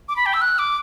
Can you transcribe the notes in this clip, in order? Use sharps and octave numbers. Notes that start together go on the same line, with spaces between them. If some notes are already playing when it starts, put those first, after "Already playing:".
D6
B5
G5
E6
F#6
D6